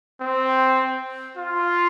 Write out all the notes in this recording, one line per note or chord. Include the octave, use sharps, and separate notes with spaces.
C4
F4